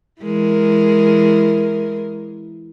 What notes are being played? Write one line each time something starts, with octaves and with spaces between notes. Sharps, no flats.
E3 G#3 A#4